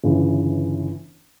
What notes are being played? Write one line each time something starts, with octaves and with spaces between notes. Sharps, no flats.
G1 C#3 E3